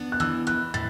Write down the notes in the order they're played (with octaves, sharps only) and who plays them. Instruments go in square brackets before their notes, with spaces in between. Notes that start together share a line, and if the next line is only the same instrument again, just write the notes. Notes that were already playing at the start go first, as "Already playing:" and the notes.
Already playing: [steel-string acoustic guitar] B3 D4
[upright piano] F#6
[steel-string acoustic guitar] E3 [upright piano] E6
[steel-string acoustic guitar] E3 [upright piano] F#6
[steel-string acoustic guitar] A2 [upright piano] A6